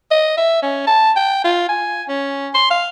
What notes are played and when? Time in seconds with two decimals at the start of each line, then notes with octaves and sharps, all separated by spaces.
0.11 D#5
0.37 E5
0.63 C#4
0.87 A5
1.16 G5
1.44 F4
1.69 G#5
2.08 C#4
2.55 C6
2.71 F5